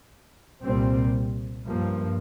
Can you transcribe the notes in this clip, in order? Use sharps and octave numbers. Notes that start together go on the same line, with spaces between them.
C2 A#2 G3 C4
G2 F3 A#3